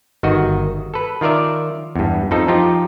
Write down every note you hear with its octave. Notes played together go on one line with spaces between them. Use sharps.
G1 D#3 F#4 D#5
A4 B4
D#3 F4 A#4 D5 E5
E2 G2
F2 F3 D#4 A4
F3 D#4 F4 G4